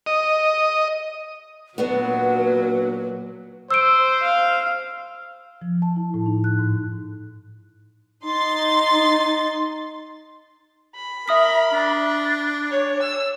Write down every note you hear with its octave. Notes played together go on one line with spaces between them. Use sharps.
D#5
A#2 F#3 B3 D4 F#4 B4
C5 E6 D7
F5
F3
A5
E4
A2
D#4
F#6
G#2
D#4 C6 A6
B5
A#4 E5 D#6 B6
D4
C#5
E6